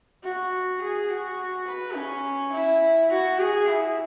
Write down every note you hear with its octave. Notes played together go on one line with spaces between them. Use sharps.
F#4
G#4
F#4
B4
C#4
E4
F#4
G#4
E4